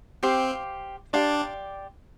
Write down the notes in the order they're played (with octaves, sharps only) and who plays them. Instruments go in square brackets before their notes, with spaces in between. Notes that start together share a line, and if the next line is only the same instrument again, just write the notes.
[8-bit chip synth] C4 [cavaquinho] G4 C5 F5 D6
[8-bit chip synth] D4 [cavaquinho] G4 D5 F5 C6